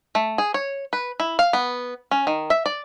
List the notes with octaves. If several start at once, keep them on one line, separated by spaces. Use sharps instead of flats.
A3
G#4
C#5
B4
E4
F5
B3
C#4
D#3
E5
D5